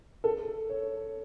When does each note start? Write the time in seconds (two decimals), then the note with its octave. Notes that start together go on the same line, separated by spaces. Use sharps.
0.24 A4
0.69 C#5